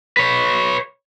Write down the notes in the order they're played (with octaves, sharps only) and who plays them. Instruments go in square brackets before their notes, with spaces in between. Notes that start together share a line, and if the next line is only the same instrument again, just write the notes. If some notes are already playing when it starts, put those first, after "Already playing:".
[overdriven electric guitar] B4 C#5